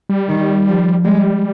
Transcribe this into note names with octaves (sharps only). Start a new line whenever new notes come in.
G3
D#3
F3
G3 G#3